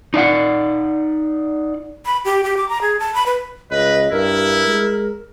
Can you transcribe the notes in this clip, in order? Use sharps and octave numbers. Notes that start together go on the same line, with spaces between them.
D#4 D5 F5 F#5
B5
G4
G4
D6
A#5
G#4
A5
B5
B4
C#2 B4 D#5
G2 E4 A#4
G#3